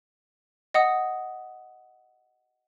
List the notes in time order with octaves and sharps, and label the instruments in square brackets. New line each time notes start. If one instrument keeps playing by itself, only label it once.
[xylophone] D#5 F#5 D#6